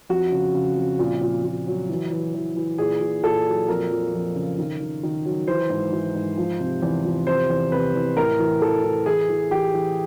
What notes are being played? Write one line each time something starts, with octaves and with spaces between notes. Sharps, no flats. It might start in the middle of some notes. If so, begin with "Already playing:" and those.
F2 F#4
C#3
C#3
F2
A#2
A#2
A#2
F#3
E3
E3
E3
E3
A#2 G#4
A#2
A#2 A4
F#3
F2 A#4
F3
F2
C#3
D#3
D#3
D#3
F#3
E3 C5
G#2
E3
G#2
F3
C3
E2
F3
C3 C5
E2
C3 B4
E2
A2 A#4
E3
E3 A4
E3
E3 G#4
E3
E3 G4
E3